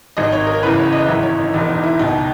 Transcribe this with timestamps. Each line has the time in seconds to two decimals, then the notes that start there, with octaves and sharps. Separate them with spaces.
0.17 G#1 G#2 D#3 D#5
0.32 C#5
0.47 A#4
0.62 F#1 E2 C#3 E3 B4
0.78 C#5
0.93 D#5
1.08 G#1 F#2 E3 E5
1.23 C#5
1.38 D#4
1.53 E1 E2 D#3 D#4
1.69 D#4
1.84 E4
1.99 C#2 B2 D#4